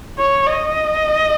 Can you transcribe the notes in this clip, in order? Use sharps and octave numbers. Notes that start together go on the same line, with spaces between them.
C#5
D#5